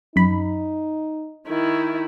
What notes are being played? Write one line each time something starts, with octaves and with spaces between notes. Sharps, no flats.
F#2 D#4 B5
D#3 E4